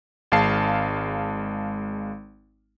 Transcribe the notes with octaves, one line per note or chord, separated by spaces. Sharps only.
G#1 G#3 F5 A5 C7